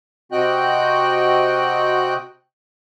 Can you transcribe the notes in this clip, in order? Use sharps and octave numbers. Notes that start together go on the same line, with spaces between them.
C3 C4 F#4 D#5 G5 F#6